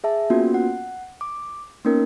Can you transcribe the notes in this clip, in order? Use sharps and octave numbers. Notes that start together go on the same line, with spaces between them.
G#4 E5 A5
A#3 B3 C#4 F4 F#4
F#5
D6
A#3 B3 C#4 D#4 A#4